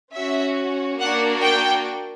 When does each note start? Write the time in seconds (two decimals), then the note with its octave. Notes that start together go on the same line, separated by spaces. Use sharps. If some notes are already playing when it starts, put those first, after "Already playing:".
0.14 C#4 F#4 E5
1.00 A#3 D4 F#4 F#5
1.44 G5